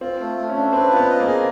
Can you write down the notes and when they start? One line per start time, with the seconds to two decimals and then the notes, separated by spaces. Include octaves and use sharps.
0.01 C4 F4
0.20 A3
0.37 A3
0.49 C#4
0.56 D4
0.72 C4 B4
0.91 F4
0.96 B3
1.09 D#5
1.20 A#3
1.26 G#4